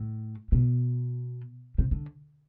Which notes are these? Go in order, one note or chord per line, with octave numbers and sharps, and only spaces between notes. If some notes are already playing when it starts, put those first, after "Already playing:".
Already playing: A2
B2
C3
D3